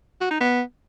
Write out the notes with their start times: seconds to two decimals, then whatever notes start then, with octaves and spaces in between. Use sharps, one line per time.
0.21 F#4
0.31 D#4
0.40 B3